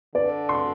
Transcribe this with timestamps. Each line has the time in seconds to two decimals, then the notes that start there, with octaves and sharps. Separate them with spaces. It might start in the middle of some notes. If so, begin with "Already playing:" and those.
0.15 D3 D5
0.49 C6